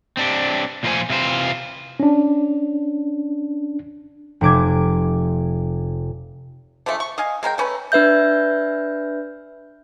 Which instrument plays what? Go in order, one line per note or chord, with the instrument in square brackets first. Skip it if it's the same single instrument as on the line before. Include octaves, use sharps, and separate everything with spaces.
[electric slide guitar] C4 D4 G4
A#2 F3 F4 B4 C5 G#5
C3 E3 F4 C5
[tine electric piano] C#4 D4
[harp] F1 C3 D6 G#6
[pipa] D3 F3 G#3 A3
C#6
D#5 F5 G#5
G#3 A#4 B4 G5
A3 C#4 B4
[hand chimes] D4 B4 E5 G6